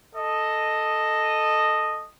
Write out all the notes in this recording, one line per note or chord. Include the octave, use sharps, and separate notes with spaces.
A4 D#5